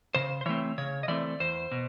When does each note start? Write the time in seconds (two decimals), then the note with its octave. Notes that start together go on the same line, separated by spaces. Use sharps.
0.15 C#3 C5
0.41 C5
0.46 E3 A3 C4 C#5
0.78 C#3 C#5
1.03 D#5
1.08 E3 A3 C4 D5
1.40 E2 C5
1.71 B2